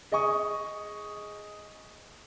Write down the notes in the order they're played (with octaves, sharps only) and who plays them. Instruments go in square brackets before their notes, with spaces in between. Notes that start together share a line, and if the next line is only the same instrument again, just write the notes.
[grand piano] G#4 D#5 G#5 C#6 D#6